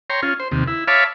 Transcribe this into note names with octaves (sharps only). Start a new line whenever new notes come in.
C#5 G5 A#5 C6
C#4 F4
C5
D#2 C3
E4
C#5 E5 F5 A5 B5 D6